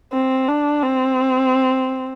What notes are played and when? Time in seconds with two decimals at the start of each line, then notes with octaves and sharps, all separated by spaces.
0.13 C4
0.48 D4
0.83 C4